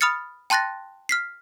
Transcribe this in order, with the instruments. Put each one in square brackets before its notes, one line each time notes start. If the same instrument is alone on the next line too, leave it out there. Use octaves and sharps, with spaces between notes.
[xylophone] B5 D#6 F6 A6 C#7
G5 A5 C6 F#6 A6 A#6
F6 B6 C7